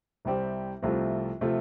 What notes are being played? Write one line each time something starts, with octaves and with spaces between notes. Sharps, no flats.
C2 C3 G3 C4 G4
C2 C3 F3 A3 F4
C3 F3 A3 F4